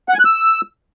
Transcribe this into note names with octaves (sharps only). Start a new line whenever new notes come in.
F#5
G#5
F#6
E6